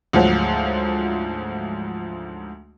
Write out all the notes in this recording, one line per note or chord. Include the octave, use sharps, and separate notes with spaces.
D2 G#2 F3 F#3